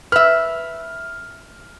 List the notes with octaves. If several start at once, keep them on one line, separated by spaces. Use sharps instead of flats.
B4 E5 F6